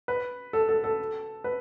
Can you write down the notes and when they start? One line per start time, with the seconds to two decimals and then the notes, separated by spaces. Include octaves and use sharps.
0.08 B4
0.53 A4
0.69 A4
0.84 A4
1.44 B4